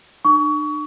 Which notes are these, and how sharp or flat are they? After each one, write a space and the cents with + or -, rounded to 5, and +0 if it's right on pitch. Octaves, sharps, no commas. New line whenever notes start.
D4 +45 C#6 +30